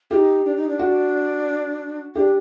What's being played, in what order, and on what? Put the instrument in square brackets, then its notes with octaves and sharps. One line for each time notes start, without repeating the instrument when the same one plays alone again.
[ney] D#4 F4 [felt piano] G4
[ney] D4
D#4
D4
[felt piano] F#4
[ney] D4 [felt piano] G4